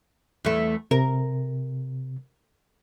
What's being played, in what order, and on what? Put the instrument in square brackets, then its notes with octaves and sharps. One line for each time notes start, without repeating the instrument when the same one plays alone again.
[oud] E2 A3
[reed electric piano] C3 [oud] A#4